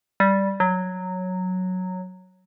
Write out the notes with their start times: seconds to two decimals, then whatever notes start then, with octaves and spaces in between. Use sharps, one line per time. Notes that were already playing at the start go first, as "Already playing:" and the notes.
0.20 G3
0.60 F#3